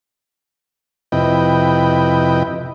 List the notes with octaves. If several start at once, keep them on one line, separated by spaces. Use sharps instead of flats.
F2 C3 E4 B4 D#5 G5